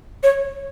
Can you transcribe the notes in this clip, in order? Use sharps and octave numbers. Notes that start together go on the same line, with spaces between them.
C#5